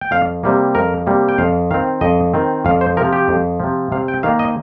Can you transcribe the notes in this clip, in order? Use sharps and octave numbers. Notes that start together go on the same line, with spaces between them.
G5
F2 F5
C3 G3 A#3
F2 A#4
C3 G3 A#3
G5
F2 F5
D#3 C4 F5
F2 D#5
D#3 C4
F2 F5
C5
C3 F3 A#4
G4
F2
C3 F3
C3 F5
G5
D#3 A#3 F5
D#5